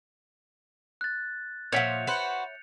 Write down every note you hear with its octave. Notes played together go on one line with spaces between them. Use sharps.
F#6 A6
A#2 F3 C#5 E5 F#5 G6 C#7 F7
F#4 B4 C5